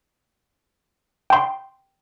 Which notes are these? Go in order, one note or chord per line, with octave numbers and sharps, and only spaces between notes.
G5 C6